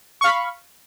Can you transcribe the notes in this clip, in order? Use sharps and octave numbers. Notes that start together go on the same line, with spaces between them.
F5 B5 C#6